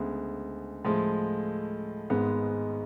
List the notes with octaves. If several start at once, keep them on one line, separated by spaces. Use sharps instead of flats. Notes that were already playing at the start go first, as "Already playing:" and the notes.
Already playing: D2 C#3 G#3 B3
A2 F3 G#3
G#1 G#2 G#3 B3